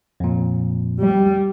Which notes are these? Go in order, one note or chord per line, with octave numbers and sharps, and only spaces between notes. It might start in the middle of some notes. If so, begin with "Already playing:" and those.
F2 A#2
G3